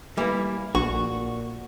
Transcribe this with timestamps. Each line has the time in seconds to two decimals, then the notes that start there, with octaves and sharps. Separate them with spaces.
0.17 E3 G3 A#3 E4
0.75 A#1 A#2 F#4 C#6